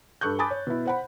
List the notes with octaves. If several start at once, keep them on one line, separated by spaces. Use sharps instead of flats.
G2 A4 C#6 F#6 G6
G#5 A5 B5 D6 D#6 A6
C#5
B2 E4
C5 F#5 B5